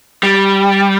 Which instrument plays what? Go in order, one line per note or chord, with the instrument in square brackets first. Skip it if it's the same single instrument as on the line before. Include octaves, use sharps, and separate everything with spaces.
[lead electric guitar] G3